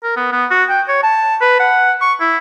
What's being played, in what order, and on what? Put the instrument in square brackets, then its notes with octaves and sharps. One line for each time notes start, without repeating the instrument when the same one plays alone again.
[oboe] A#4
B3
B3
F#4
G5
C#5
A5
B4
F#5
C#6
E4